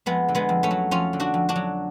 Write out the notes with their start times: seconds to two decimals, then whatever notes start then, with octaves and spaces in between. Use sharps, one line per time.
0.06 F2 G#3 B3
0.28 D3
0.35 G#3 B3
0.49 F2
0.63 A3 C#4
0.71 F#3
0.91 F2 C#4 F4
1.13 D3
1.20 D4 F#4
1.34 F2
1.49 D4 F#4
1.56 F#3